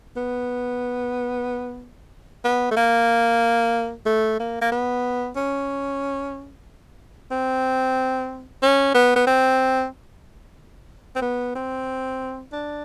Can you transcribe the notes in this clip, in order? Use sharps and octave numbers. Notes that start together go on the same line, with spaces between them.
B3
B3
A3
A#3
A3
A#3
A#3
B3
C#4
C4
C#4
B3
B3
C4
C4
B3
C4
D4